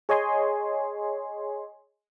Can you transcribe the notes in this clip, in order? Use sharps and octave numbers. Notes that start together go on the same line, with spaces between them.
G#4 C#5 D#5 G#5 C6